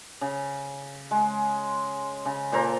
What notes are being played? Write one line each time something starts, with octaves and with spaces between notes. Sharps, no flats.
C#3
G#3
C#3
A#2 A4 C5 A#5